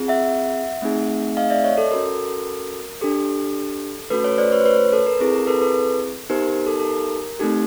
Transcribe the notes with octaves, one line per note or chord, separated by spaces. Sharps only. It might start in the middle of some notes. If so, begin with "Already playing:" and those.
Already playing: C4 F4 G#4
E5 F#5
A3 C4 D#4 G#4
D#5 F5
D5 E5
C#5 D#5
A4
C#4 F#4 A4 A#4
D4 G4 A4
A3 C#4 F#4 A4 B4
B4 C#5
C5 D5
B4 C#5
C5
B4 C#5
A4 B4
A#4
C4 E4 G#4 A4
A#4
A4 B4
A4 B4
B3 D#4 G4 A#4 C5
A#4
A4
A4
A#4
A3 C4 D#4 G4 A4